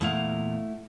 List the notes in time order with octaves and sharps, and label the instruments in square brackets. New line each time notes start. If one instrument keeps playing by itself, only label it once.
[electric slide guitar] E2 A#2 F5 [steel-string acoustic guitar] A3 E4 F#5